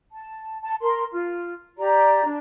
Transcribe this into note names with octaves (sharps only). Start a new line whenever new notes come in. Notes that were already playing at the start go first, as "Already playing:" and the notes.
A5
A5
A#4 C6
F4
G4 D5 A#5
D4